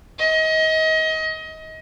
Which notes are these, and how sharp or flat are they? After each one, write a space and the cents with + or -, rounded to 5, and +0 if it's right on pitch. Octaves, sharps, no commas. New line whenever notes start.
D#5 +30